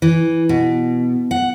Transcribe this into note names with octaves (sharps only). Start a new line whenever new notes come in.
E3
B2
F#5